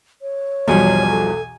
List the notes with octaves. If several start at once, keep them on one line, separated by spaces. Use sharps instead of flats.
C#5
B1 E2 B2 F3 G3 G#5
A4